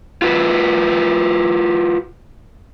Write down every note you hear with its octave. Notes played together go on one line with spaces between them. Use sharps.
F4 F#4 B4